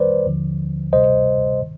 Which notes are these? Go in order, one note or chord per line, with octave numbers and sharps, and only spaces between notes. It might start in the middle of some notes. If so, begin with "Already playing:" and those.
Already playing: F2 D#3 G3 B4 C5 D5
D#2 D3 F3
D2 C3 G3 C5 D#5
D#3